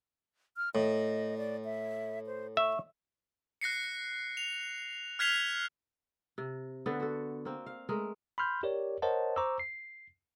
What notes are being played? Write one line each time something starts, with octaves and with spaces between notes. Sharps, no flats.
F6
A2 D#5
D5
E5
C5
E5 C#6
F#6 A#6 C7 C#7
F7
F6 F#6 G#6 B6 C7 F7
C3
D3 B3 D4 A4
F#4 A4
A#3 C4
F5
G#3 A3 A#4
B5 C6 F6 G6
G4 A#4 C#5 D5
A#4 C5 C#5 D#5 F#5 A5
C5 A#5 C#6 D6 E6
C7